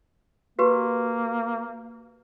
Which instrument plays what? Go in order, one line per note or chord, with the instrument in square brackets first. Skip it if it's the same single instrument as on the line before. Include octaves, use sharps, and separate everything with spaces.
[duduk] A#3 [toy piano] F#4 G4 B4